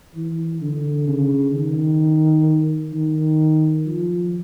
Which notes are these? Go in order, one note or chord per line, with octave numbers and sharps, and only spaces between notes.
E3
D3
C#3
D#3
D#3
F3